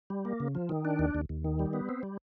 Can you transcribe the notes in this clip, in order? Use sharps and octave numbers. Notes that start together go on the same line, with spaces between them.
G3
A#3
C#3
F3
D#3
D4
D#2
D#2
D#2
D#3
G3
B3
C4
G3